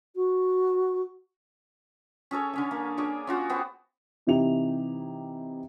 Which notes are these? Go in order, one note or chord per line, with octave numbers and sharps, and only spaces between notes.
F#4
C#4 G#4 A4 C#5
D3 C#4 G#5
A#3
D4 G#4 C#5 D5
C#4 F4 F#4
B3 G4 C5 F#5
C3 E3 D#4 E4 G4 F7